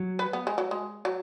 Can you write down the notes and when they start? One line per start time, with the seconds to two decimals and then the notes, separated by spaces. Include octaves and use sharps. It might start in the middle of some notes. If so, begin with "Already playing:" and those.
Already playing: F#3
0.19 B4
0.33 B3
0.47 G#3
0.58 F#3
0.71 G#3
1.05 F#3